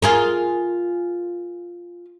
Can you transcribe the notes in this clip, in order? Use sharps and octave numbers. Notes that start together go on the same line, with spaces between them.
F4 G#4 A#4